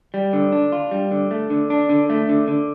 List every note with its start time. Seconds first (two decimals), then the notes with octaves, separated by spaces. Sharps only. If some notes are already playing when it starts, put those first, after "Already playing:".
0.14 G3
0.33 D3
0.52 D4
0.72 F4
0.91 G3
1.11 D3
1.31 A3
1.50 D3
1.70 D4
1.89 D3
2.10 A3
2.29 D3
2.48 D3